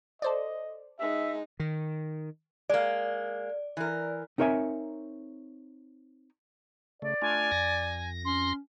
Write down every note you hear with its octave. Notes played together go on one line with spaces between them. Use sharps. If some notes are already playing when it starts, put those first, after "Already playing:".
A4 C5 D5 D#5
G#3 D#4 E5
D#3
G#3 A#3 D5
E3 A#4
C4 D#4 A#4 C#5 E5 G#5
C#3 A3 D5
A3 D4 F4 G#5
F2 A#6
C#4 C6